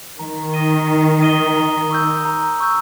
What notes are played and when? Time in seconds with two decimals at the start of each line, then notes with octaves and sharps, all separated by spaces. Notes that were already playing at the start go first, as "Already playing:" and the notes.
0.19 D#3 A#5
0.53 D#6 A#6 D#7 G7
0.88 A#5
1.22 D#6 A#6 D#7 G7
1.57 A#5
1.91 C#6 E6 G6
2.25 A#5
2.60 C#6 E6 G6